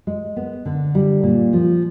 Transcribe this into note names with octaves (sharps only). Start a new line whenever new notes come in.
G#3
B3
D3
G3
A#2
F3